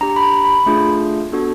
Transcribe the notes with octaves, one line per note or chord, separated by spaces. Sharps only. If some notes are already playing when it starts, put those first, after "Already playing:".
D4 G4 A#5
B5
A#5
B5
A3 D4 F4 G#4
B3 D4 F#4 A4